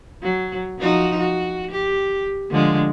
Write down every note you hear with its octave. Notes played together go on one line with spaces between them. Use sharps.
F#3
F3 D#4 F#4
F#4
G4
D3 F3 G#3